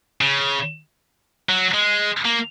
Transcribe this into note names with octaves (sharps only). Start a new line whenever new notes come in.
C#3
F#3
G#3
A#3